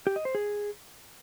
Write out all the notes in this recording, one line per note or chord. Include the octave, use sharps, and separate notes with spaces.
G4
D#5
C5
G#4